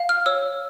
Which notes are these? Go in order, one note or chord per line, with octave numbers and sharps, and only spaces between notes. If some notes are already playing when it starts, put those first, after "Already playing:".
Already playing: F5
F6
C#5 E6